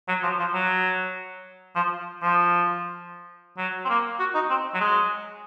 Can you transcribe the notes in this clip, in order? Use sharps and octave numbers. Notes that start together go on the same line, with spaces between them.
F#3
F3
F3
F#3
F3
F3
F#3
C4
A#3
F#4
D#4
C4
F#3
G#3